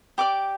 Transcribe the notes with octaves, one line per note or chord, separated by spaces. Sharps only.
G4 D5 D6